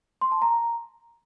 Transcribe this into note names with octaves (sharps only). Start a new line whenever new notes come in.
C6
A5
A#5